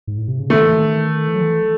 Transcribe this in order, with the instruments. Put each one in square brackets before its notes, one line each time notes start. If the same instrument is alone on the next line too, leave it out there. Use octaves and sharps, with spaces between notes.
[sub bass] G#2
A2
C3
C#3
[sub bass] D#3 [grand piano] A3
[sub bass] E3
D#3
E3
F#3
E3